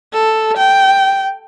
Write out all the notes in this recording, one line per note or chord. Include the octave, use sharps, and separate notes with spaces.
A4
G5